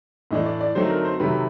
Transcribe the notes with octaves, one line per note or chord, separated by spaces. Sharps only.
A2 E3 A3 D4 D#5
D5
D5
D3 F#3 A3 C4 D#4 C5
A#4
C5
C3 D#3 F#3 A3 B4